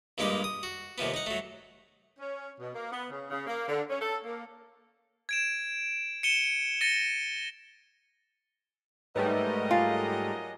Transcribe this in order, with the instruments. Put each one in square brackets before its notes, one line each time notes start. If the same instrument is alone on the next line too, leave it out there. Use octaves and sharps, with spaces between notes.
[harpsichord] G2 A#2 G#3 A#3 D#4 G4
D#6
F#4
D#2 C3 F3 B3
D#4 F#5
F#3 A3
[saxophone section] C#4
B2
A#3
B3
C#3
C#3
A#3
D3
C#4
A4
A#3
[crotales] G#6 D7 E7
C#7 D#7 E7 G7
A6 A#6 C#7 D#7 G7
[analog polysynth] G#2 G3 A3 [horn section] F#3 A#4 D#5 [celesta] B4 C#5
[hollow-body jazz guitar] F4 [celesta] G#5 A6 C7